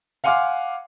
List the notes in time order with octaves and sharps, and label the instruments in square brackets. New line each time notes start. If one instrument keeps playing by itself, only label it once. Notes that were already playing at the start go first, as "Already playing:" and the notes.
[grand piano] F5 F#5 G#5 C6 D6 F6